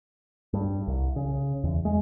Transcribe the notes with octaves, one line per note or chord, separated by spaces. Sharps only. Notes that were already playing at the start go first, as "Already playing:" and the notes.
G2
C2
C#3
E2
G#3